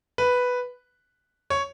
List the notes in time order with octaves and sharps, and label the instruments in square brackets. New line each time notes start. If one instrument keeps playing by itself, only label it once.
[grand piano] B4
C#5